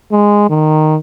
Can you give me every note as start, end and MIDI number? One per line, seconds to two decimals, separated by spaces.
0.11 0.48 56
0.49 0.97 51